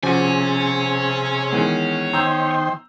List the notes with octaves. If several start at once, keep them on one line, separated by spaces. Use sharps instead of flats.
C3 F3 C#4 F#4 G#4 C#5 G#5
D#3 E3 G#3 B3
D#3 C5 G5 A#5 E6 G6